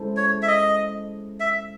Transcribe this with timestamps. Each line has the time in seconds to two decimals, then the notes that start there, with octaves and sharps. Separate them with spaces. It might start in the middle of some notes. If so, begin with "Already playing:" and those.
Already playing: G#3 C#4 E4 A4 C5
0.17 C#5
0.42 E5
0.48 D#5
1.40 E5